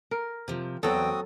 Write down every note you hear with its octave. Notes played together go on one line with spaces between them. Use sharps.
A#4
C3 F3
E2 F#3 C4 F#4 A4 G5 D#6